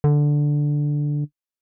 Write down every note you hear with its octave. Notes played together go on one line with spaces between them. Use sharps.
D3